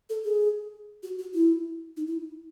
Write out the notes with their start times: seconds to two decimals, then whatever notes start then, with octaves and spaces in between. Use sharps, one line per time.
0.10 A4
0.25 G#4
1.03 F#4
1.19 F#4
1.34 E4
1.97 D#4
2.07 E4